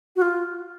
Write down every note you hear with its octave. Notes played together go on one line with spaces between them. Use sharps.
F#4
F4